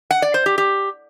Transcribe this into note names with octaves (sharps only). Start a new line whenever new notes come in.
F#5
D5
C5
G4
G4